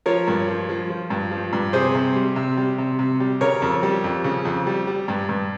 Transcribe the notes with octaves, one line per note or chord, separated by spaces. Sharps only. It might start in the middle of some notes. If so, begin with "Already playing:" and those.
F3 A#4 C#5
G2
F3
F3
F3
G2
F3
G2
C3 G#4 C5
C3
G3
C3
G3
C3
C3
G3
C#3 A#4 C#5
F2
G3
F2
C#3
F2
G3
G3
G2
G2